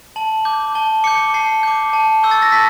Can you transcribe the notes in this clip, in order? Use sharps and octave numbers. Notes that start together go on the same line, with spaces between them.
A5 F#7
D6 G6
A5 G7
D6 G6 C#7
A5 C7
D6 G6
A5
C#6 E6 G6
A6
A#6
A5 B6